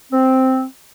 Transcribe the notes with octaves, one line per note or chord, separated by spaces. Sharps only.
C4